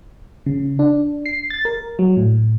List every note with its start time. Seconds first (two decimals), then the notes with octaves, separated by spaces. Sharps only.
0.46 C#3
0.79 D4
1.26 C7
1.50 A6
1.65 A#4
1.99 F#3
2.17 A2